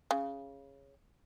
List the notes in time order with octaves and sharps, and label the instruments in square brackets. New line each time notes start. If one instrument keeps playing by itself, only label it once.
[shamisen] C#3